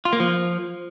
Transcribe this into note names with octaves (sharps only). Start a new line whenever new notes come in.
F4
A#3
F3